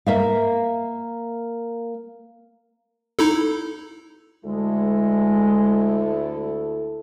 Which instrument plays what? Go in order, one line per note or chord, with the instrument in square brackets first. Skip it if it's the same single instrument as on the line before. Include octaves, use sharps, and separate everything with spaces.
[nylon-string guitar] A#3 E5 F5
[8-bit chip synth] D#4 E4 A4
[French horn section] D2 E4 A4 [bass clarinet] G#3